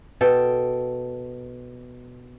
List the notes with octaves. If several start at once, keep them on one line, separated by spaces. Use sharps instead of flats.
B2 A4 G5